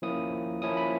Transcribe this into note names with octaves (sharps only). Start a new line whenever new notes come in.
F3 A#3 C#4 E4 D#6
F3 A#3 C#4 E4 D#6
B5